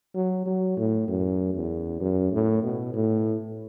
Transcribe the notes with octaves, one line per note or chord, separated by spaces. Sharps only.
F#3
F#3
A2
F#2
E2
F#2
A2
B2
A2